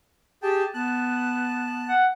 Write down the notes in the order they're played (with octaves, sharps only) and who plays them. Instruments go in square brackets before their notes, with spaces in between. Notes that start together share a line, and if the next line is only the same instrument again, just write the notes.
[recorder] G4 [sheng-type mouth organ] G#4 G5 A5
[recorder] B3 [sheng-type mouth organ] A5 F#6
[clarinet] F#5